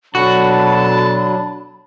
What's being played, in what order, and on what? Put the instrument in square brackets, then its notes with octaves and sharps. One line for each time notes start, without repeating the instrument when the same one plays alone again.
[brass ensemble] B2 A4 A5 [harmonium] F#3 D4 [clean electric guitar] F#4 [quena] B5